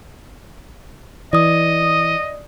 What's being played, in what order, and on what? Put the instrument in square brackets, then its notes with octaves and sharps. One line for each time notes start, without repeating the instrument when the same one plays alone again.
[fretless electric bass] E3 [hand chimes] D5 D#6 [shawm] D#5